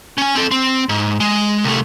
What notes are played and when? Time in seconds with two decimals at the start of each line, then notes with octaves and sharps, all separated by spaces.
0.18 C#4 G#5
0.35 C4 A4
0.51 C4
0.89 G#2
1.20 G#3
1.64 C2 A3